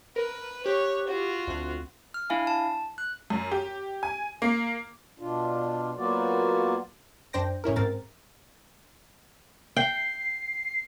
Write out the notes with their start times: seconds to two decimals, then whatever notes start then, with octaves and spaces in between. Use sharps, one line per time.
0.16 A#4 B4
0.66 G4 C#5 F#6
1.08 F4 F#4
1.47 D2 C4 F#6
2.14 F6
2.30 D4 E4 F5 G#5
2.47 A5
2.98 F#6
3.30 F#2
3.51 G4
4.03 G#5
4.42 A#3
5.19 B2 D4 F4
5.97 F#3 A#3 B3 F4 F#4 D5
7.33 F#2 D4 C5 G5 A#6
7.64 A2 C#4 E4 A#4
7.76 G#2 C4 A#4 A6
9.77 G5 C7